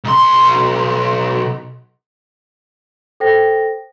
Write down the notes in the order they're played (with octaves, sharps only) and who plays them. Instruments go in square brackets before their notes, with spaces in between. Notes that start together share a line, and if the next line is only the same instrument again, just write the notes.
[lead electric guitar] B1 C6
[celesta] A4 C5 G5 A#6